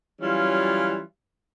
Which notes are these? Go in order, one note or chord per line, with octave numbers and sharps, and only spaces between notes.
E3 F#3 G3 C#4 F4